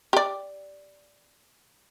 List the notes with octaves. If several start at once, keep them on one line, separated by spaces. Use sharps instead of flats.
G4 D5